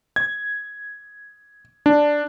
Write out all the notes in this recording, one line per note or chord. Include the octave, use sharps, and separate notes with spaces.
G#6
D4